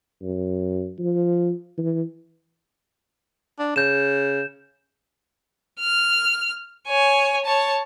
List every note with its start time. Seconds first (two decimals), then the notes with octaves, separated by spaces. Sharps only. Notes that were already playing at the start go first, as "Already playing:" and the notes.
0.22 F#2
0.99 F3
1.78 E3
3.59 D4
3.76 C#3 G6 E7
5.80 F6
6.88 C#5 G#5
7.45 C#5 A5